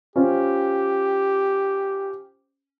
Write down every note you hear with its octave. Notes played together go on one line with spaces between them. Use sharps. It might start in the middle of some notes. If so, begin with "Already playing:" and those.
C#4 F4 G4 C5